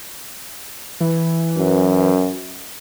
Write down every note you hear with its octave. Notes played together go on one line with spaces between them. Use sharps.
E3
F#2